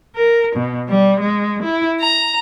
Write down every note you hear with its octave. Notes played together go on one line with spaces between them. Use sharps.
A#4
B2
G3
G#3
E4
A#5